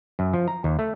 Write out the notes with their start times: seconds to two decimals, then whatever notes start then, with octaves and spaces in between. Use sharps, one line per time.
0.19 F#2
0.33 F3
0.48 A#5
0.64 D#2
0.79 A3